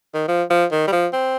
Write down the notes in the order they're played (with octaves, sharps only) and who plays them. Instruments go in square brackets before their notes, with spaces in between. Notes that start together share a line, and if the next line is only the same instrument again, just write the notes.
[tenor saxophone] D#3
F3
F3
D#3
G3
F3
C4